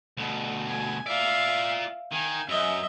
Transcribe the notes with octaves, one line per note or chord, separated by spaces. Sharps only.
D2 B2
G#5
F4 D5 E5 F5
D#3 G#5
F#2 D#5 E5